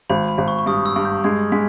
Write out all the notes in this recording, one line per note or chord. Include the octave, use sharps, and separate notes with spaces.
G#1 B5
B5
G#1
C#6
C#6
G2 D#6
E6
G2
G6
G#3 G#6
G#3 B6